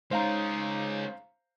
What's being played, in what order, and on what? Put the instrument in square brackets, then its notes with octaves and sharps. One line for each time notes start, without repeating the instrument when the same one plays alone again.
[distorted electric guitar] G#3 C#4 [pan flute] D#4 [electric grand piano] C5 F5 A#5